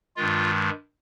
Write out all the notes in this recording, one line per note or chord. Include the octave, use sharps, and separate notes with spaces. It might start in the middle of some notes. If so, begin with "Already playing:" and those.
G2 D#3 G#3 F4